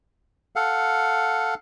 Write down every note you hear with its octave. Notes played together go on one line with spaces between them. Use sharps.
A4 F5 F#5